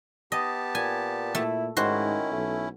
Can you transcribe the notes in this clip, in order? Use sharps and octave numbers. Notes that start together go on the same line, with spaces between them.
B3 G4 D#5 A5
A#2 G#5
A#2 A3 E4
G#2 D#3 C#4 E4 F#4 C5
B1 A3